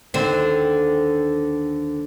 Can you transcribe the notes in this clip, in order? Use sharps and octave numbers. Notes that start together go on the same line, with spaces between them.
D#2 D3 C4